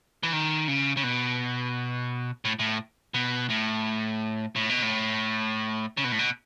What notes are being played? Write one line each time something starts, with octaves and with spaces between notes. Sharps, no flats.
E3
D#3
C#3
C#3
B2
A2
A2
B2
A2
A2
B2
A2
C#3
B2
A2
B2